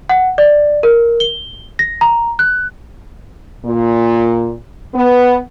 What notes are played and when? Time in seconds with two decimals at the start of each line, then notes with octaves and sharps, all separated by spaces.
0.09 F#5
0.38 D5
0.83 A#4
1.20 G7
1.79 A#6
2.01 A#5
2.39 F#6
3.65 A#2
4.95 B3